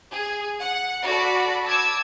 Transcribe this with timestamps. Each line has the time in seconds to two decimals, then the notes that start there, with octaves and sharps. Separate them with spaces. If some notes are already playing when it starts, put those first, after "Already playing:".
0.11 G#4
0.59 F#5
1.05 F#4 A4 D5 B5
1.66 A5 D6 E6 G#6